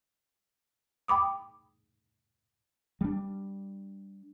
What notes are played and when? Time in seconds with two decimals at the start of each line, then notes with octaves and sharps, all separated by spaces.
1.08 G5 B5 D6 D#6
3.01 G3 D4